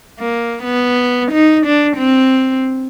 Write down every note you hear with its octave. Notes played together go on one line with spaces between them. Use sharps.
A#3
B3
D#4
D4
C4